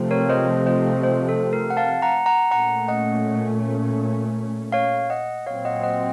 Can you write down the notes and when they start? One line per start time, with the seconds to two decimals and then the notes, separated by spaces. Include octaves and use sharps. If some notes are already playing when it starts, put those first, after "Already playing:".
Already playing: C3 F3 A3 C4
0.11 A#4 C#5
0.29 C5 D#5
0.66 C5 D#5
1.03 C5 D#5
1.28 A4 C5
1.53 A#4
1.70 F#5
1.77 F5 A5
2.02 F#5 A#5
2.26 F#5 A#5
2.51 A#2 A3 C#4 F#5 A#5
2.88 D#5 F#5
4.72 C#5 F5
5.10 D#5 F#5
5.46 A#2 F#3 C4 C#5 F5
5.65 D#5 F#5
5.83 D#5 F#5